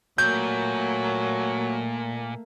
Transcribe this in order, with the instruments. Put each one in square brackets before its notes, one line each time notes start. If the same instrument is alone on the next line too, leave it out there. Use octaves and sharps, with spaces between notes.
[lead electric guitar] A#2 [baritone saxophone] F#3 [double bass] A3 A#3 [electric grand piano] G6